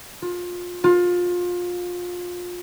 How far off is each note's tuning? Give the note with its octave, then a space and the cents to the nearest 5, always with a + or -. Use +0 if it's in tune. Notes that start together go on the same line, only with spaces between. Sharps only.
F4 +25
F4 +25